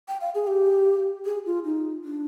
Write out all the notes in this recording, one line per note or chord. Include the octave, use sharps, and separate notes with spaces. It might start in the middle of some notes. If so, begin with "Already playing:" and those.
G5
F5
G#4
G4
G#4
F4
D#4
D4